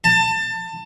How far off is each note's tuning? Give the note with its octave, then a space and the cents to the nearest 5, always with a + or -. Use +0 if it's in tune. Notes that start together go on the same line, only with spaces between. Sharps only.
A5 +25